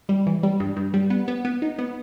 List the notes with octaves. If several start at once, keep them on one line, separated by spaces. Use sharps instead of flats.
G3
E3
G3
G2
G2
G3
B3
B3
B3
D#4
B3